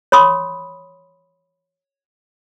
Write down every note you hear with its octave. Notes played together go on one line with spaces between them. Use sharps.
C#5 B5 C6 D#6